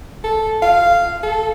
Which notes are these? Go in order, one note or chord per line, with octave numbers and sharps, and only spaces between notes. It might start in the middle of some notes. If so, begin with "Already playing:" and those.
A4
F5
A4